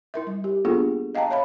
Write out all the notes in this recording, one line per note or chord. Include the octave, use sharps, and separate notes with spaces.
E4 A#4 E5
G3
G4
A#3 B3 D4 F4 G#4 A4
D#5 F5 G5 A5 A#5
C#5 E5 F5 B5